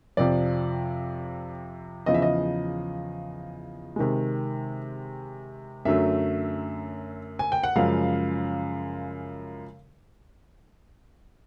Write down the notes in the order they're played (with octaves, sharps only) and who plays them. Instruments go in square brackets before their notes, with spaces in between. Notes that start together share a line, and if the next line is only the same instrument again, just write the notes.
[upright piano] F2 C3 F3 D5
E2 C#3 F3 D#5
E5
D#5
C3 D#3 G#3
F#2 D3 F#3 A3 E5
G#5
G5
F#5
F#2 C#3 F3 G#3 F5